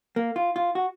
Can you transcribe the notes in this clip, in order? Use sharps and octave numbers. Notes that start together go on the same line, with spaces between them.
A#3
F4
F4
F#4